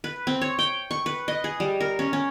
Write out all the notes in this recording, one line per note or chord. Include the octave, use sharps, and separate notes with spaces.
B4
C4
C#5
G5
C#6
B4
D#5
G#4
G3
A#4
C#4
C#4